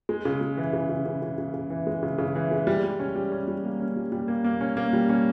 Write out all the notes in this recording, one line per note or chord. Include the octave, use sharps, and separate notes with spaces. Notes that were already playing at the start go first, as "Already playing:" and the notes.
G#3
C#3
G#3
E3
C#3
C#3
C#3
C#3
C#3
C#3
E3
G#3
C#3
C#3
E3
G#3
G3
G3
C#4
G3
C#4
G3
A#3
C#4
G3
G3
A#3
A#3
C#4
A#3
G3
C#4